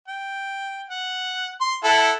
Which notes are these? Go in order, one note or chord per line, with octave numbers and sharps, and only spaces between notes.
G5
F#5
C6
E4 A4 F#5